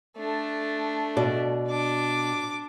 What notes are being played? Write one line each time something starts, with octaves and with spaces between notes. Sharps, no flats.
A3 D4
B2 D5
D4 D6